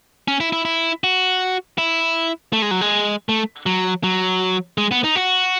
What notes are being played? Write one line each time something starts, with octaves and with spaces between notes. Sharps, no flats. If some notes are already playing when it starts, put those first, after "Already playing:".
C#4
E4
E4
E4
F#4
E4
A3
G#3
F#3
G#3
A3
F#3
F#3
G#3
B3
D#4
F#4